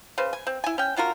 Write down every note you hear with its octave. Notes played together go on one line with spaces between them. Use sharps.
C#3 B4 C5
G#5
C4
E4 G#5
C#4 G5
D4 F4 F#4 A#4